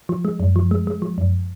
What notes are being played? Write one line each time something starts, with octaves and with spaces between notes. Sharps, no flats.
F3
G#3
F#2
F3
G#3
G#3
F3
F#2